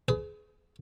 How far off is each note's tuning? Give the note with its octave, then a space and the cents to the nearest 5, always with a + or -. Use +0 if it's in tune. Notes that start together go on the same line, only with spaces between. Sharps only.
G#4 +25 B4 +40